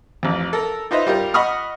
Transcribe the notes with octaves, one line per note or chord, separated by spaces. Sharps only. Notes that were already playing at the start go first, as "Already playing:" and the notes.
A1 F2
A4 A#4
D#4 F4 B4 C5 D#5 E5
G3 F4 G4 A#4
D#5 F#5 B5 C#6 D#6 F6